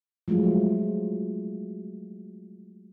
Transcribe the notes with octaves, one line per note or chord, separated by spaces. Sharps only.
F3 F#3 G#3 A3 F4